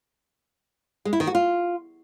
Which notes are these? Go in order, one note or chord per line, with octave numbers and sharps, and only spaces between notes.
G#3
E4
D#3
F#4
F4